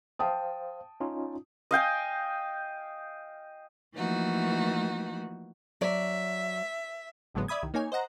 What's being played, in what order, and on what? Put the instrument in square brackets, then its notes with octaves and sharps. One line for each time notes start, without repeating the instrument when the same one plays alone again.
[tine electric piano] C5 F5 [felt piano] G5 A5 D#6
[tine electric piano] C#4 D#4 F4
[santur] D#5 F5 G5 G#5
[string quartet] E3 F3 A3 A#3 D#4 F#4
[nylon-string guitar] F#3 D5 [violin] E5
[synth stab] G#1 A2 D3 F#3 G#3 B3
D5 E5 B5 D#6 G#6
C2 D#3
A#3 D#4 C#5 G#5
C5 D#5 F#5 A#5